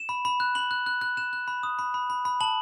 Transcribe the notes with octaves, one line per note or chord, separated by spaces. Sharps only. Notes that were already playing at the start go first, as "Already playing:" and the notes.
Already playing: E7
B5
B5
F#6
B5 F#7
F#6
F#6
F#6
F#6 E7
F#6
B5
D#6
B5
B5
B5
B5
A5 F#7